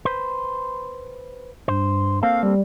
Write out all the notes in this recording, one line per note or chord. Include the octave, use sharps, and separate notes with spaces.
B4 C5
G2 C5
A#3 C4 A4 F5
G3